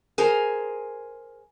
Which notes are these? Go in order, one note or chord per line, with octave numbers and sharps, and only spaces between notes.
G#4 A#4 C5 G#5